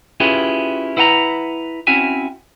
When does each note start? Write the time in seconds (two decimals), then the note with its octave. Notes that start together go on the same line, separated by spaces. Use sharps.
0.20 C#4 E4 F4 G4 G#4 B4
0.97 E4 B4 F#5 G5 A#5
1.87 C4 C#4 E4 F#4 E5 G#5